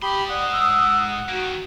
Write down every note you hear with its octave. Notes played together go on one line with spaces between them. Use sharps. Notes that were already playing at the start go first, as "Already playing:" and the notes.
G#2 G4 B5 C6 D#6
D5 F#5
E6
D#3 A#3 F#4